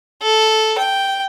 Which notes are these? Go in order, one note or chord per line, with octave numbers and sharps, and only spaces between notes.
A4
G5